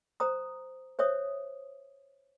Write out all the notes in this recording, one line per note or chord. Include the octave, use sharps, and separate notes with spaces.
C5 A#5 D#6
C5 C#5 E5 D#6